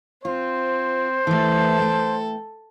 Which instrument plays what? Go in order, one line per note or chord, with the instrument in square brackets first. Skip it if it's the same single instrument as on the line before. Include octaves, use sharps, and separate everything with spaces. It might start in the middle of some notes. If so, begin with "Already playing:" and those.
[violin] C4 [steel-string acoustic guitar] F4 [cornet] C5
[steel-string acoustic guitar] E3 A3 [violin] A4
[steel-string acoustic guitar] A3 G5